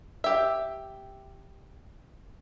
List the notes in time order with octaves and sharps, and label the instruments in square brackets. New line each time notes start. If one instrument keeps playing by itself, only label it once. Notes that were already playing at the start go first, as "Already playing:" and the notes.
[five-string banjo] G4 E5